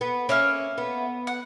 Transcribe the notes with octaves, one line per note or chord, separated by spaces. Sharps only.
B3
A#3 C#4 E5 F6
B3
F#5